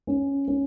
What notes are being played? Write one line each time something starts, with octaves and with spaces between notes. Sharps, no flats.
C#4
C#4